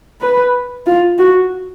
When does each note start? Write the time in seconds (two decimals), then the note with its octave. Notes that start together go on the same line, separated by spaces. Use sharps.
0.21 B4
0.86 F4
1.18 F#4